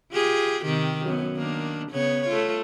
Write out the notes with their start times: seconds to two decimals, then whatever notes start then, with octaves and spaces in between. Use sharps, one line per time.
0.12 F4 G4 G#4
0.64 C3 D#3 G4
1.05 F#2 B3
1.36 D#3 A#3 D4
1.91 C#3 B3 C#5
2.28 A3 F4